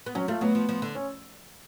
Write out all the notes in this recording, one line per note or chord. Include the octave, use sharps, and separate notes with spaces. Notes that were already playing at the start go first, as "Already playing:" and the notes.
B3
F#3 C#4
A3 F4
F#3 B3
F3
F3
D3
C#4